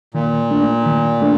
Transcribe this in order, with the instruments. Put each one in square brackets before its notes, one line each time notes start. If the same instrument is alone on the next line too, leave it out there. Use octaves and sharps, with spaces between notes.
[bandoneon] A#2 [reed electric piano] D#3
[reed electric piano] A3 D4
D#3
A3 D4